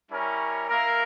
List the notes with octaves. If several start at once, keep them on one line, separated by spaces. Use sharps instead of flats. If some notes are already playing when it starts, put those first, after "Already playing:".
G3 C#4 E4 A#4 C#5
A#3 E4 A#4